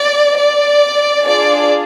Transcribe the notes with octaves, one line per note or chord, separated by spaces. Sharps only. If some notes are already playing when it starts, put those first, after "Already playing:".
Already playing: D5
D5
D4 F4 G#4 D5